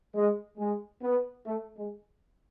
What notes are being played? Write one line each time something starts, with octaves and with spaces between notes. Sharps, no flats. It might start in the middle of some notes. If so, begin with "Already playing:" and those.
G#3
G#3
B3
A3
G#3